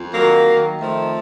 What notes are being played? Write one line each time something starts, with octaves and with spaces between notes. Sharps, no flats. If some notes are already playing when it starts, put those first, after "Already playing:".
Already playing: F2
D#3 F#3 A#3
D#3
F2 F3 A3